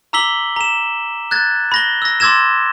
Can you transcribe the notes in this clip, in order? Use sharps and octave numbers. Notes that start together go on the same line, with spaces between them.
A#5 D6 E6 B6 F#7 G7
A#5 E7
F#6 G#6 A6
B5 A#6 G7
E6 A#6
C6 D6 E6 G#6 A6 E7